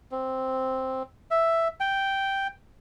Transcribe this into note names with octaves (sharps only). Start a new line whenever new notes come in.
C4
E5
G5